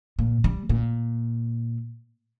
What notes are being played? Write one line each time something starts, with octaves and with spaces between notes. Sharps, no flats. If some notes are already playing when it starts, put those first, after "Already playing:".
A#2
G3
A#2